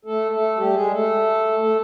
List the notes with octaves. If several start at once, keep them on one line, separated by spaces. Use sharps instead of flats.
A3 A4
A3 A4
G3 G4
G#3 G#4
A3 A4
A3 A4